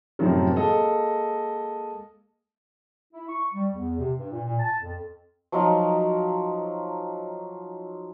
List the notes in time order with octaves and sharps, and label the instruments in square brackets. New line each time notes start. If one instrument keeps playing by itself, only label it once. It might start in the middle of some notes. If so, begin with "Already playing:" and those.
[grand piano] F#2 A2 C3 D#3 F3 F#3
G#3 A#3 A4 D#5
[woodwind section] E4
C#6
G3
E2
C3
G2
A#2
A#2
A5
F2
[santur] F3 F#3 D#4 F4